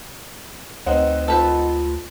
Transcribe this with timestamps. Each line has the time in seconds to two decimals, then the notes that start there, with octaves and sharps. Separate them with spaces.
0.86 D2 C4 D#4 B4 F#5
1.28 F4 A4 B4 C5